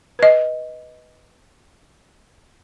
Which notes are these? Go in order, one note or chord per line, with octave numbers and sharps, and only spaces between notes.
B4 D#5